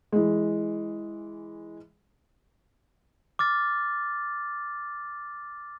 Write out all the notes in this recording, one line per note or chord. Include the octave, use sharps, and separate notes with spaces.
E3 G#3
D6 F6 A6